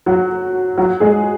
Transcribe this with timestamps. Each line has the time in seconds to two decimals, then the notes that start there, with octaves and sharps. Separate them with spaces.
0.06 F#3 F#4
0.78 F#3 F#4
1.00 G#3 G#4